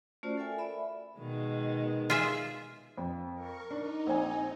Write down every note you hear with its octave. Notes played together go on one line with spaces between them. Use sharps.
A3 C#4 F4 F#4 C5 D5
A4 A#4 E5 G5 G#5
D5 E5 B5
B2 D#3 G#3
F4 G#4 E5
F2
A#4 C#6
D4 D#4
A#1 C4 G#5